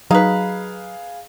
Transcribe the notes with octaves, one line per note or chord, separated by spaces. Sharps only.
F#3 D#4 G#4 B4 F5